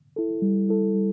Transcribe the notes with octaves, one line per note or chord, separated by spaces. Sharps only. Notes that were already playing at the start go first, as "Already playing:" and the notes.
E4 A4
G3
E4 A4
G3